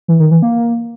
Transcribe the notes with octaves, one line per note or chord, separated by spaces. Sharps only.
E3
D#3
E3
A#3